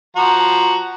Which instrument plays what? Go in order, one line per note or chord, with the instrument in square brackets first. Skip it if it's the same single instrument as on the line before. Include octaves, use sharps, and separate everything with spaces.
[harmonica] F3 F#4 A#5